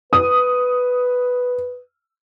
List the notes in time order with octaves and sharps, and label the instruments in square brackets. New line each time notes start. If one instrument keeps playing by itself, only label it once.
[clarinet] B4 [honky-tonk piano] D#6